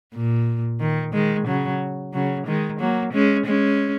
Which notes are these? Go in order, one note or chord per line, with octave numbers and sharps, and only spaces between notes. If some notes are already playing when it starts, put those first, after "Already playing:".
A#2
D#3
D#3 G#3
C#3 F#3
C#3 F#3
D#3 G#3
F#3 A#3
G#3 C#4
G#3 C#4